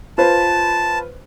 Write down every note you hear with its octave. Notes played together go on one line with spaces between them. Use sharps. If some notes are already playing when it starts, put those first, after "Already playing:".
F4 B4 C5 A5